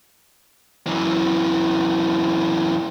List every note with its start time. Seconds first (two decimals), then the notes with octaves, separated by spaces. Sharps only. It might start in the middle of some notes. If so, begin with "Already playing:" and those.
0.87 F#2 E3